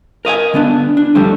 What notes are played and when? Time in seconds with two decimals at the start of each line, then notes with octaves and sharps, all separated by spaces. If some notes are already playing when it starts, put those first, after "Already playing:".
0.25 A#4 D#5 F5 G#5
0.54 D3 B3 D4
0.97 D4
1.15 F2 D3 G3 A3